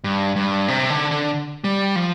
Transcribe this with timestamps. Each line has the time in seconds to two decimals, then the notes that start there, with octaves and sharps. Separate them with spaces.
0.04 G2
0.36 G2
0.68 C3
0.90 D3
1.11 D3
1.64 G3
1.96 F3